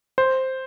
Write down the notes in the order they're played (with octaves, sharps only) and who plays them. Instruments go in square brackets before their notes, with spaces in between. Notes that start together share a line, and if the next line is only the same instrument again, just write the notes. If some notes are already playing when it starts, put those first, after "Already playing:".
[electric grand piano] C5